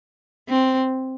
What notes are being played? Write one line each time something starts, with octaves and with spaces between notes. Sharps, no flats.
C4